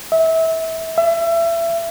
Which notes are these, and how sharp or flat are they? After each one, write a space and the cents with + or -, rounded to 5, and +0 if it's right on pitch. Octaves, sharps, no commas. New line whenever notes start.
E5 -25
E5 +30